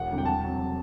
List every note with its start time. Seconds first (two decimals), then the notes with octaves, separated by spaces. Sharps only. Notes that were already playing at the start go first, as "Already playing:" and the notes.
Already playing: E1 F#5
0.10 D2 C3 G3
0.18 G5
0.25 E2 A5
0.43 C3 F#3